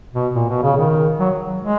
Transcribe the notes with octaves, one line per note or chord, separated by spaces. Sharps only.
B2
A#2
B2
C#3
D#3
F#3
G#3